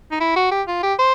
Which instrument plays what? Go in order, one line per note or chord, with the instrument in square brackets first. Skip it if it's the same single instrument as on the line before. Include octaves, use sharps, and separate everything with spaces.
[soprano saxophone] D#4
E4
F#4
G4
F4
G4
C5